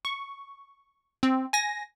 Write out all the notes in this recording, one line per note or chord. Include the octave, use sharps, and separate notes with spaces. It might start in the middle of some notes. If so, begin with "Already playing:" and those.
C#6
C4
G#5 A#6